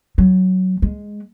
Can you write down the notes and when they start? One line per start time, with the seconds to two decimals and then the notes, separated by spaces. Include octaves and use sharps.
0.18 F#3
0.82 G#3